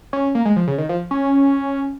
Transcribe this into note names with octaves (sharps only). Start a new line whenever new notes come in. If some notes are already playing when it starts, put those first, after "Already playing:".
C#4
A#3
G#3
F3
C#3
D#3
F3
C#4